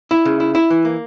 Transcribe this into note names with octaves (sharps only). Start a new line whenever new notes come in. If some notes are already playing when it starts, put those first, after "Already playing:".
E4
C#3
E4
E4
E3
A#3